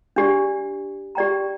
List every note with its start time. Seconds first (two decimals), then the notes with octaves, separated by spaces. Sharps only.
0.16 D4 G4 D5
1.15 G4 D5 G5 A#5